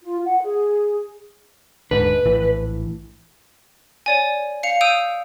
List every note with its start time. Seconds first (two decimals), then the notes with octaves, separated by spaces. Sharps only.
0.02 F4
0.24 F#5
0.43 G#4
1.91 D#1 G#2 D3 B4
2.26 A#1 A2 E3
4.06 C#5 D5 G#5
4.63 F5 C#7 F7
4.81 D#6 E6 G6 D7 D#7 F7